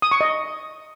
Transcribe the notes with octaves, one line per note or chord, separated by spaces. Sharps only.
D#6
C#6
D#5